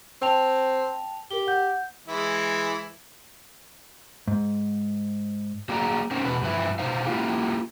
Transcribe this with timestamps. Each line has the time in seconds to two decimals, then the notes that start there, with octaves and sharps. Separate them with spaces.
0.22 C4 G5 A5 F7
1.31 G4 A#4 G7
1.47 F#5 G6
2.08 E3 G#3 E4
4.28 G#2
5.69 F#3 A#3 G#4 D5 A#5
6.11 C4 C#4 D#4 A#4 C5
6.24 E2 B2 B4
6.41 G2 F3 B4 E5
6.79 B2 D#4 C5 F5
7.06 A#3 E4 F4 G4